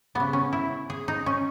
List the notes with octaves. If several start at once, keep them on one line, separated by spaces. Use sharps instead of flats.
C#3 G3 B3
C#4
E4
G#4
D#4
C#4